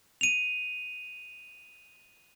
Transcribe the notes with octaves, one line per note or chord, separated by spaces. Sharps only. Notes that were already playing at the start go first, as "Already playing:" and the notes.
D#7 F7